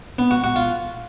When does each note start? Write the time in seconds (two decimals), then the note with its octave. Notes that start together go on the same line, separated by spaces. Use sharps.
0.19 B3
0.31 F#4
0.44 F#4
0.56 F4